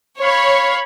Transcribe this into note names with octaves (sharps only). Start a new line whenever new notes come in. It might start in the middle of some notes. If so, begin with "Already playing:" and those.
C#5 F5 B5